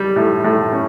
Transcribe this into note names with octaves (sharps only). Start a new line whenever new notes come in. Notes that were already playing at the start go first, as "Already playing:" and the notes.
Already playing: G3
A2
A2
C#4